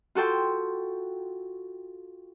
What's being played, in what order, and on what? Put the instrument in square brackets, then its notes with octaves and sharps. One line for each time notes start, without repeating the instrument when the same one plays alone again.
[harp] F4 F#4 A4 G5 C6